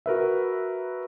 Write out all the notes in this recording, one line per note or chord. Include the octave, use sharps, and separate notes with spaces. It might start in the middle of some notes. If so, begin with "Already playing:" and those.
F#4 A#4 B4 E5